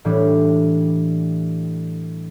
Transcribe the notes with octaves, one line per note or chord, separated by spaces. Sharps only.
A2 E3 G3 D4